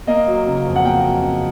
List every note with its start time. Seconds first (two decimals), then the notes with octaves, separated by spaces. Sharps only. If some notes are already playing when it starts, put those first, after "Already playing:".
0.07 A#3 D#5
0.27 F#3
0.47 C#3
0.66 F2
0.76 F#5
0.85 A#3 G5
1.04 F#3
1.23 C#3